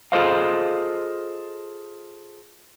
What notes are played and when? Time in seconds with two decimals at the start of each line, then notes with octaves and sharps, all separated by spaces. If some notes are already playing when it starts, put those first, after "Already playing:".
0.12 F4 G#4 A4 C5 D#5 F5